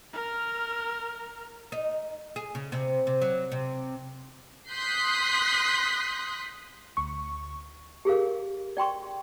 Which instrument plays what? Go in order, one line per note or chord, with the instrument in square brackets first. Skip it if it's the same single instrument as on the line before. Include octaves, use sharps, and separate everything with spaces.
[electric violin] A#4 F6
[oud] D#4
G#4
C#3
C3
C3
F#3
C3
[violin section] C6 D#6 F#6 G6 B6 C7
[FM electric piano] D2 C#6
[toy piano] G4 G#4 A#4 F5
D5 G5 C6 C#6